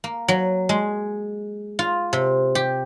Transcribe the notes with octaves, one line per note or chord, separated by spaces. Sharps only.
A#3
F#3
G#3
F4
C3
G4